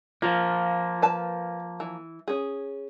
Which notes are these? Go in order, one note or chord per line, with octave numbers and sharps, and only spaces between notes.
F3 A#3 F4
B4 A5
E3
C#4 G#4